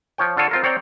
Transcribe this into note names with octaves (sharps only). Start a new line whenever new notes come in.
F3 C#5 G5
D3 F4 A4 C#5
C4 F4 A#4
C4 C#5 D5 G5 A#5